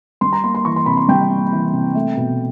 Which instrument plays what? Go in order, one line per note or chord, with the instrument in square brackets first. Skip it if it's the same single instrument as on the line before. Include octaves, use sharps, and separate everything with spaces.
[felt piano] G3 C6
A#5
A#3 C6
C6
E3 C#6
C6
C3 B5
C6
G3 G5
A#3
E3
C3
A3
B2